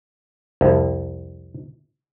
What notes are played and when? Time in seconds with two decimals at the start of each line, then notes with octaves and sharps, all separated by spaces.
0.61 C2 F2